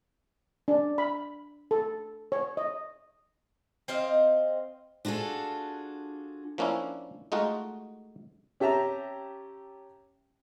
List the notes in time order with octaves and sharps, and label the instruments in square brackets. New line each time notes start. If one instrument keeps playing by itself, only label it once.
[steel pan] D4
B5
A4
C#5
D#5
[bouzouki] C4 C5 D#5 F5
[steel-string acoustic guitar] D4 F4 F#4 G#4 A4
[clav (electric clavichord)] F3 A#3 C#4 D4 E4
G#3 A3 D#4 F4 F#4
[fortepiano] C#4 G4 E5 A5 A#5